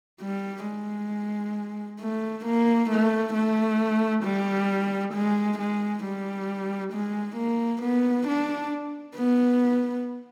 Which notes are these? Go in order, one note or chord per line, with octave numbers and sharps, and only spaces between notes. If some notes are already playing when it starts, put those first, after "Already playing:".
G3
G#3
A3
A#3
A3
A3
G3
G#3
G#3
G3
G#3
A#3
B3
D4
B3